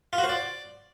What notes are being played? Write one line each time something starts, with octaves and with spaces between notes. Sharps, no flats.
F4
F#4
C5
D5